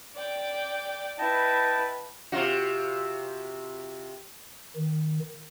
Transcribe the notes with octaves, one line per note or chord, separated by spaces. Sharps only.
D5 G5
E4 B4 D#5 G5 A5
C3 F4 F#4
D#3